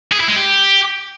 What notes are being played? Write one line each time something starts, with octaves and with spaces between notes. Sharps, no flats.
G#4
E4
G#3
G4